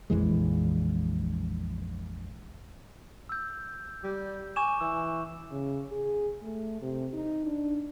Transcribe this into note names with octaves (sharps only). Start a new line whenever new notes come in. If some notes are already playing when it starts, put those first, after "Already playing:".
A#1 F2 E3 G#3
E6 G6
G3
G#5 C#6 D6 E7
E3 E6
C#3
G#4
A3
C3
D#4
D4